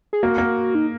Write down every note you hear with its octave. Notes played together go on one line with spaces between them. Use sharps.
G#4
A#3 F#4
A#3
D#4